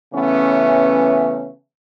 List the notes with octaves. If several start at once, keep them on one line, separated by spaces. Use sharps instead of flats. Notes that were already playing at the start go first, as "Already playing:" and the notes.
C#3 E3 A3 B3 C#4